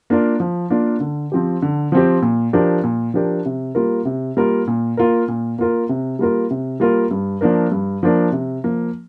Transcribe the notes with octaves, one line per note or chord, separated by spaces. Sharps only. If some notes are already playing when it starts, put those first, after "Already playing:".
A#3 D4 F4 A#4
F3
A#3 D4 F4 A#4
D3
F3 C4 G4
D3
F3 C4 G4
A#2
F3 D4 G4 A#4
A#2
F3 D4 G4 A#4
C3
G3 A#3 F4 A#4
C3
G3 A#3 F4 A#4
A#2
A#3 F4 A#4
A#2
A#3 F4 A#4
C3
G3 A#3 F4 A#4
C3
G3 A#3 F4 A#4
G2
F3 A#3 D4 A#4
G2
F3 A#3 D4 A#4
C3
F3 A#3